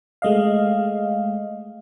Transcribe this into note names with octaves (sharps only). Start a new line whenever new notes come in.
G#3 A3 D#5 F5